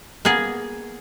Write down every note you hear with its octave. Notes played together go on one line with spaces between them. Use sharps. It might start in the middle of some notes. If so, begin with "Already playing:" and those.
A#3 B3 G#4